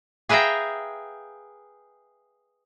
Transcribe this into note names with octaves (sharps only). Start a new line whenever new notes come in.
G#4 B4 E5 F5 G5 A#5